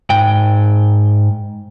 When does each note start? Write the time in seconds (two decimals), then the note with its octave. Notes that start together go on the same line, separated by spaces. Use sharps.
0.10 G#2 G5